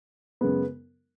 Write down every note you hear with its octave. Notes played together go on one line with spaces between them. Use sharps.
F#2 C#3 G#3 B3